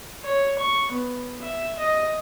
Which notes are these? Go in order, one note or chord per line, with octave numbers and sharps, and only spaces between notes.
C#5
C#6
B3
E5
D#5